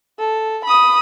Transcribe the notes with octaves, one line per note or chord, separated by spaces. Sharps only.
A4
B5 D#6